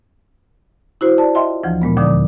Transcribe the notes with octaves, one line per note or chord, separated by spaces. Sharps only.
E4 F#4 C5
D5 A5
F4 D#5 E5 G5 C6
D2 E3 F3
A#2 G#3 B3
D#2 D3 F3 D5 D6 D#6